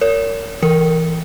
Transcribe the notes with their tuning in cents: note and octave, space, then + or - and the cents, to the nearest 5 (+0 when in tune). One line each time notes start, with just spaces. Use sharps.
A#4 -20 C#5 +35
E3 +0 A#4 +0